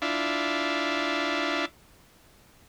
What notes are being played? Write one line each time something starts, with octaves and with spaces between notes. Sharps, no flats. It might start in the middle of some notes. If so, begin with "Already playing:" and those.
D4 E4 F4